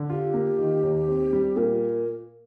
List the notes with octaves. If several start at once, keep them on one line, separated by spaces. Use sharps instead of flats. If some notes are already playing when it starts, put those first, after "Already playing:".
Already playing: D3
F4 G4
A#3
D#3
D#2
C4
G3
A#2 A#4